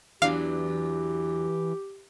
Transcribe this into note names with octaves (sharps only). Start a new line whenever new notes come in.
E2 E3 F#3 D4 G4 F5